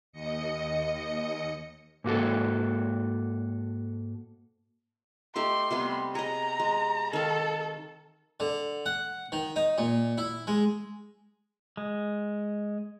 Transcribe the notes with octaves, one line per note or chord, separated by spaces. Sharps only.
D#2 D#5 C#7
G#2 A#3 F#4 A4
A3 D#4 G4 C6
C3 G3 B3
G#4 D#5 A#5
G#3
D#3 A4 F5
D3
F#5
D#3
D#4
A#2
E4
G#3
G#3